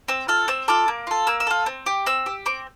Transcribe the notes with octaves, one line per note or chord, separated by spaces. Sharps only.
C4 E6
F4 A4 F6
C4 E6
F4 A4 D6
A#3
F4 A4
A#3 E6
E6
F4 A4
C4
G4
C4 E6
G4
C4 D6